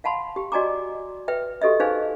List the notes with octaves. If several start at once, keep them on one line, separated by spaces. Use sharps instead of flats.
F5 F#5 A5 B5 C6
G4 G5
F#4 D5 D#5 G#5 A#5 D6
B4 E5 G5
F#4 G4 A4 D#5 E5
D#4 G#4 B4 C5 F5 G#5